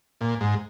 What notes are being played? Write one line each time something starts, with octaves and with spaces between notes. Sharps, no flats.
A#2
G#2